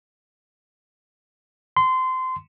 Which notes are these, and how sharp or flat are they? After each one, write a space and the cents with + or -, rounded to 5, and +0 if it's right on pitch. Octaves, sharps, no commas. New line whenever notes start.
C6 -25